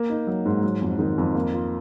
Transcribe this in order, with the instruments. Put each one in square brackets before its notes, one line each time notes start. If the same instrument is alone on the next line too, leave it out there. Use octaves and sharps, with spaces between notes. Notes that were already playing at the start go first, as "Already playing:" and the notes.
Already playing: [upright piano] A#3
D#4
F#3
G#2
F#3
F2
D#3
F2
A#3
F4